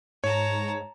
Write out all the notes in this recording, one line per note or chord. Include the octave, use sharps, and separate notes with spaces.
G#2 C#5 A5 A#5